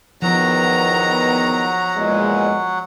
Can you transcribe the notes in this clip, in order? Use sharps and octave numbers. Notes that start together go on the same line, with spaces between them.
E2 D#3 F3 F#3 B3 F#5 A#5
E2 A#2 G#3